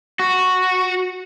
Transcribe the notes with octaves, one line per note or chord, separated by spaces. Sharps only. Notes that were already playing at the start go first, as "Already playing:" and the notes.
F#4